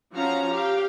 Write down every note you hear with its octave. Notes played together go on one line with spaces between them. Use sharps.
F3 C#4 F#4 F5 A#5
G4 F5